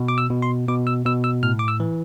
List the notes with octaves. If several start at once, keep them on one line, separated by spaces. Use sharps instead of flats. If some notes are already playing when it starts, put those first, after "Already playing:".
Already playing: B2
D6
E6
B2
C6
B2 D6
E6
B2 E6
E6
A2 F6
D6
E6
E3